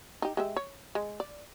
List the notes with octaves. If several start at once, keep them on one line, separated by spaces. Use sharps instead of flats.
D#4 G4
G#3 G4 E5
C#5
G#3
D5